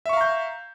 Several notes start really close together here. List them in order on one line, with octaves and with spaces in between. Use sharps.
E5 C#6 F5 A#5 G6